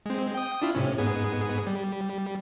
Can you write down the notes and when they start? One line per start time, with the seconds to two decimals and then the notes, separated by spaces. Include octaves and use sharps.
0.06 G#3 C4
0.35 G5 D#6
0.62 D4 E4 F4
0.75 A2 C3 C#4
0.98 G#2 B3 G#4
1.67 G3